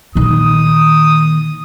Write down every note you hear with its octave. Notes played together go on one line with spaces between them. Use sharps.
A#2 D#3 D#6